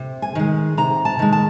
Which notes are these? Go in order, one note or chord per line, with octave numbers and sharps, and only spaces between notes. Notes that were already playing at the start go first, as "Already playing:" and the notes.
Already playing: C3
G#5
D#3 G#3
C3 A#5
A5
D#3 G#3
A5